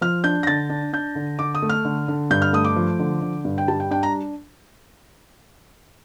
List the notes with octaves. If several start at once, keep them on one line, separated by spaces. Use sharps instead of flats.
F3 F6
D4 G6
A#6
D3 A6
D4
D4 G6
D3
D3 D6
D#6
A3
F6
D3
D3
G2 G6
F6
A3 D#6
D6
F3
D3
D3
G2
G5
G3 A5
G5
D4 G5
A#5